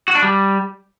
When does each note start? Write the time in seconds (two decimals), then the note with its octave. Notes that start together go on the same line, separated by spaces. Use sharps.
0.08 F#4
0.15 D4
0.22 G3